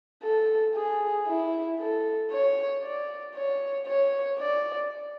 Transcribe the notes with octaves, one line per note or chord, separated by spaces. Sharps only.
A4
G#4
E4
A4
C#5
D5
C#5
C#5
D5